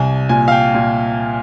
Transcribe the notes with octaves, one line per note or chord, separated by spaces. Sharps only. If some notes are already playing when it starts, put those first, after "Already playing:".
Already playing: C2 G#5
A#2 G#5
F5
G5
A#2